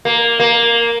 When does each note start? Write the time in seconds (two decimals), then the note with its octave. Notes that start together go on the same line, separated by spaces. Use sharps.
0.05 A#3
0.40 A#3